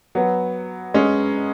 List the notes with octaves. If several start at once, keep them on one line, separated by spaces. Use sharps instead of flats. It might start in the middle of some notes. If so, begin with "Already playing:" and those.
F#3 B3
G#3 C#4